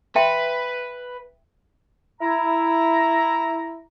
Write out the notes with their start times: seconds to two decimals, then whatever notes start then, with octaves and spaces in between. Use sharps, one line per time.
0.16 B4 E5 G5 C6
2.21 E4 A#5